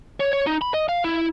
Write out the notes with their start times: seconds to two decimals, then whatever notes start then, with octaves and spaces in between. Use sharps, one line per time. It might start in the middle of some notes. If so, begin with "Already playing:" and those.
0.20 C#5
0.33 C#5
0.47 D#4
0.62 B5
0.74 D#5
0.89 F5
1.04 E4